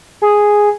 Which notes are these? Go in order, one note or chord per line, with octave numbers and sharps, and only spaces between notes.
G#4